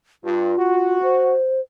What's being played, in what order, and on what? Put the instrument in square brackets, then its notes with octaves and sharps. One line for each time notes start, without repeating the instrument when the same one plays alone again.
[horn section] G2 [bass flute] F4
[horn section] F#4
[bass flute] C5